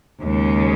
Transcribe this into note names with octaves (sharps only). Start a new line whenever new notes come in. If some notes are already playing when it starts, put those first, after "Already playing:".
D#2 C#3 G#3